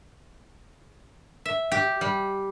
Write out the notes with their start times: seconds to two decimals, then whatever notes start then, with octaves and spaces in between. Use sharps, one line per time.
1.45 E5
1.72 G4
2.01 G3